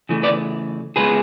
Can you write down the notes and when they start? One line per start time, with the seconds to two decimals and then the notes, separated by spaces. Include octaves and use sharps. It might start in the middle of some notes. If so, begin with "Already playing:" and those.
0.09 C#3 E3 A3
0.23 B4 D5
0.96 C#3 G#3 B3 G#4 B4